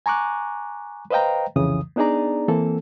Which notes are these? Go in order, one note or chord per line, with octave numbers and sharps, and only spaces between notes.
G#5 A#5 C#6 D6 F#6
B4 C5 D#5 F5 G5 A#5
C2 F2 C#3 E3 D#6
B3 D4 D#4 G#4 D5 A#5
E3 A#3 C4 A4